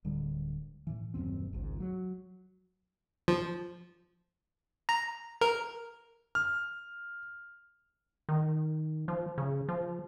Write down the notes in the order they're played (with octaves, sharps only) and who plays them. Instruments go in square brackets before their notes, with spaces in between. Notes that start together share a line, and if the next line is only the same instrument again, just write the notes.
[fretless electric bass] D1 D3 G3 G#3
A2 E3
D#1 G#1 F#2 C4
G#1 C#2 G#2
F3 F#3
[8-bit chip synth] F3
A#5
A#4
[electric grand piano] F6
[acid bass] D#3
F3
C#3
F3